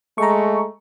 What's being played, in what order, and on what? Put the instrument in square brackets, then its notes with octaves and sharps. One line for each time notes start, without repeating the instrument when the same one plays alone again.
[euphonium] G#3 [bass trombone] A3 [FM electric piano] A#5 C#6